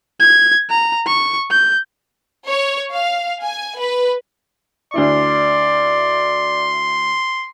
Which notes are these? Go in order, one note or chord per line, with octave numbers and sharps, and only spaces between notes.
G#6
A#5
C#6
G6
C#5
F5
G#5
B4
D2 D4 E4 D5 C6